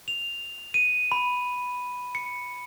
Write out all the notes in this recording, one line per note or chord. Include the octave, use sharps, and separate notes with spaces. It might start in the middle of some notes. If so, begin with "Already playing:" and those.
F7
D#7
B5
C#7